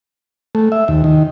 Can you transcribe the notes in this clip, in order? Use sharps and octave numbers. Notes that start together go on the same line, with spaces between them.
A3
E5
D#2
D#3